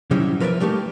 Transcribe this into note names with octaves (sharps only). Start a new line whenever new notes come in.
C3 F#3 G3 C#4 D#4 E4
F3 A#4 B4 C#5 D5 E5
G3 A3 A#3 D#4 G4